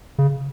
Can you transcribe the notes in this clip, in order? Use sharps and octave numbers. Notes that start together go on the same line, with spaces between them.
C#3